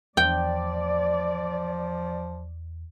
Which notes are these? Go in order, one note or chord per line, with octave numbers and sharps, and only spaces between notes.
E2 F3 D5 G5